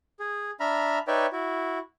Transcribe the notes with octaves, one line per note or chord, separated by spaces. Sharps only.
G#4
D4 E5 A#5 B5 F6
D#4 B4 C#5 D5 E5 G5
E4 F#4